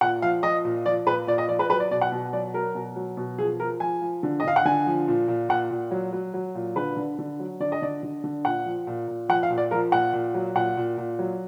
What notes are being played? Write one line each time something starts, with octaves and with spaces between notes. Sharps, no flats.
A#2 F#5
F3 F5
F3 D#5
A#2
F3 D5
A#2 B4
A#2 D5
D#5
F3 D5
B4
F#3 B4
D5
B2 D5
F#5
B2
F#3 D5
F#3 A#4
B2
F#3
B2
F3 G#4
F3 A#4
F3 G#5
F3
D3
D#5
D3 F5
F#5
D3 G#5
F3
A#2
A#2
A#2 F#5
A#2
F#3
F#3
F#3
A#2
D3 B4
D3
D3
F#3
D3 D5
D#5
D3 D5
D3
D3
A#2 F#5
F3
A#2
A#2
F3 F#5
F5
A#2
D5
F3 A#4
A#2 F#5
A#2
F#3
A#2 F#5
A#2
A#2
F#3